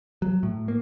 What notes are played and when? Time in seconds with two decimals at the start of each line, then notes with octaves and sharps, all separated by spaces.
0.22 F#3
0.43 A2
0.68 A#3